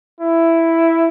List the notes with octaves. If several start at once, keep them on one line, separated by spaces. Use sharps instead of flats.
E4